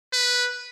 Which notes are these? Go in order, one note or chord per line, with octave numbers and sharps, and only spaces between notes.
B4